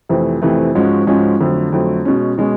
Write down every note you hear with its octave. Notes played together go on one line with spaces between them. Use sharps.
F2 C3 E3 A3
F2 C3 E3 A3
G#2 F3 G#3 C#4 F#4
G#2 F3 G#3 C#4 F#4
F2 D3 F#3 A3
F2 D3 F#3 A3
B2 G#3 C#4
B2 G#3 C#4